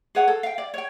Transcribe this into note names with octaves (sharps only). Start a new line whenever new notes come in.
G#4 B4 C#5 F#5
A4
F5 G5
D5
C#5 G5